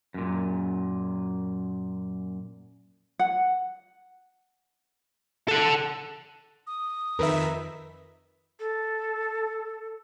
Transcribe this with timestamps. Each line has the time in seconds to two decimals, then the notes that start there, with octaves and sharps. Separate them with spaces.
0.14 F#2 A#2
3.19 F#5
5.48 A4 F#5
6.67 D#6
7.19 F2 D#3 A#4 B4 E5
8.60 A4